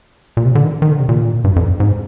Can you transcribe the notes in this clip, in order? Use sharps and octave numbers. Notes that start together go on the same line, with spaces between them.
A#2
C3
D3
D#3
D#3
D3
C3
A#2
G2
F2
G#2